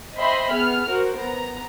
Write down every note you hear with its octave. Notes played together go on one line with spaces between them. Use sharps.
C5 D#5 E5 G5 B5 C6
B3 G#4 F6
F#4 A#4 C5
B3 A#5